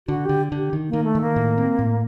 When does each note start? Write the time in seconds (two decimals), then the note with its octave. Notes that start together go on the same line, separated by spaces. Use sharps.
0.08 D3 F#4
0.25 D3 G4
0.52 D3 G4
0.73 D#3
0.89 D#3 A#3
1.04 A3
1.15 D#3
1.21 A#3
1.36 A2
1.58 C4
1.79 A2